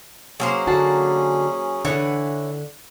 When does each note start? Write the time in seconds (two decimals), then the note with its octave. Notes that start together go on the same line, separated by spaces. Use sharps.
0.40 F#3 A#3 C#4 G#4 C5
0.67 D3 F#4 A5
1.85 D3 E3 D4 C#5 F#5